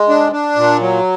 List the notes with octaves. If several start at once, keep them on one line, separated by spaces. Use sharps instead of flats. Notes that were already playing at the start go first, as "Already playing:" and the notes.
Already playing: G#3
D4
D4
A#2
F#3